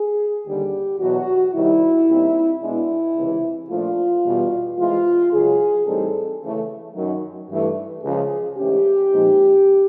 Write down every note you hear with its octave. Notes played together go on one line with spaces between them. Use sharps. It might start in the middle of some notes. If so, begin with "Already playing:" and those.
Already playing: G#4
D#2 D3 G3 G4
E2 B2 F#3 F#4
C3 D#3 G3 E4
A#2 G3 C4 D#4
B2 G#3 B3 D4 E4
C#2 C3 E3
A#2 F3 A3 D4 F4
E2 B2 G3
C3 E3 G#3 F4
C#2 C#3 F#3 G#4
A2 E3 G3 C4 D#4 A4
C#3 E3 A3
F#2 D#3 F#3
G2 E3 A3
C#2 C#3 F3 G#4
G#2 E3 A3 C#4 G4
A#2 F3 G#3 C4 D#4